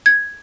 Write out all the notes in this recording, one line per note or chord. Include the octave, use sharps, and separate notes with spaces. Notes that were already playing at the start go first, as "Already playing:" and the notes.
G#6